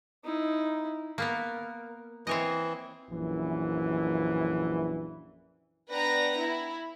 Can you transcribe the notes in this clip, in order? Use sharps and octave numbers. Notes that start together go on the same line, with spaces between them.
D#4 E4
A#3 B3 A#4
E3 C4 C#5 D#5
A#1 F#2 E3
B3 D4 B4 G5 A#5 A#6
E4